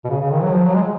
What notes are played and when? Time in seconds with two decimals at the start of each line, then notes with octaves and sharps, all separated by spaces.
0.05 B2
0.10 C#3
0.21 C#3
0.31 D#3
0.43 F#3
0.53 F3
0.63 F#3
0.75 G#3